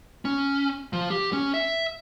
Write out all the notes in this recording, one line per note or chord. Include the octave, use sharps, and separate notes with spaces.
C#4
F3
G4
C#4
E5